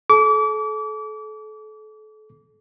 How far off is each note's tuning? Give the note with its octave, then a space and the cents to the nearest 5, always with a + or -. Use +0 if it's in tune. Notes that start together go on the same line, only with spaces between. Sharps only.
A4 -35 D6 -35